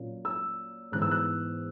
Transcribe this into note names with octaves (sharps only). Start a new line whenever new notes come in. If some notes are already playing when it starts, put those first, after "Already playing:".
Already playing: A#2 F#3 A#3 C#4
E6
G#2 E3 B3 F#6
E6
F#6